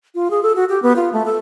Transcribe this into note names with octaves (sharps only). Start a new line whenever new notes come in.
F4
G#4
A4
F#4
G4
B3
F4
A3
A4